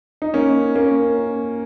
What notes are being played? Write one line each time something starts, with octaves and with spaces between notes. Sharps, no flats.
D#4
A#3 C#4
A#3 C#4